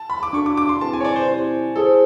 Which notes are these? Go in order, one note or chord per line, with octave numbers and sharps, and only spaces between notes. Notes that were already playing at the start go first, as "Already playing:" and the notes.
Already playing: A5
B5
D6
D4 F#4 A4 C#6
D6
D6
C6
C4 E4 G#4 B4 A5
G#5
C#5
D5
C5
C4 E4 G4 C5
E4 G#4 A4 C5